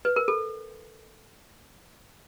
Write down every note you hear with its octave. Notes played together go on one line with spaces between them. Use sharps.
B4
A#4
A4